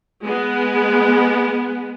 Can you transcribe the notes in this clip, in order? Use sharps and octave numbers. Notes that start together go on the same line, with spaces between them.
G#3 B3